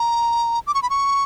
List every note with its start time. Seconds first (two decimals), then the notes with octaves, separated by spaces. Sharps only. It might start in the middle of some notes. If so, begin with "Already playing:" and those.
Already playing: A#5
0.67 D6
0.74 C#6
0.83 B5
0.90 C#6